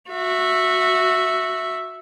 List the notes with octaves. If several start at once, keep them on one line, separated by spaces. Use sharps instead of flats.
F#4 E5